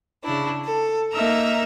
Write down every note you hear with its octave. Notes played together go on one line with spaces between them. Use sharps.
C#3 D4 E4
A4
A#3 D#4 A#4 E5 A#5 E6